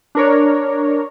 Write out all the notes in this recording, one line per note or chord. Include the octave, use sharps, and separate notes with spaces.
D4 A#4 C#5